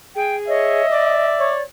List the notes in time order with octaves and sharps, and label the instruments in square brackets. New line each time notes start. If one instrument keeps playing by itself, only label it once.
[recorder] G#4 [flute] G5
[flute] C#5 [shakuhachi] D#5 [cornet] E5
[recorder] D5 [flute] D6
[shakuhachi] C#5